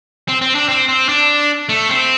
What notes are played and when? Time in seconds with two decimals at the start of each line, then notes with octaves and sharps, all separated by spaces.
0.28 C4
0.42 C4
0.55 D4
0.69 C4
0.89 C4
1.09 D4
1.69 A3
1.89 C4